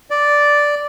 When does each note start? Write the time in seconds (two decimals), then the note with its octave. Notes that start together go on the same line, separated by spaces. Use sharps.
0.11 D5